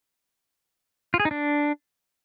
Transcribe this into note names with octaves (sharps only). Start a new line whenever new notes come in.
F4
G#4
D#4
D4